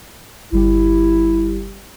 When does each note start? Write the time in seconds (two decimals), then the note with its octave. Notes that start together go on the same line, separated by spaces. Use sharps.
0.52 G1 G3 E4 G4